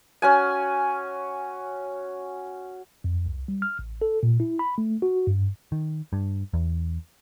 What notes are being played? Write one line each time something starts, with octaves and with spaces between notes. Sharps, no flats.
C#4 F#4 G#5
F2
C2
G3
F6
A1
A4
A#2
E4
B5
A3
F#4
G2
D#3
G2
E2